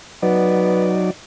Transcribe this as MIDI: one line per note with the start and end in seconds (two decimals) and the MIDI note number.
0.22 1.10 54
0.22 0.92 59
0.22 1.10 63
0.22 1.10 74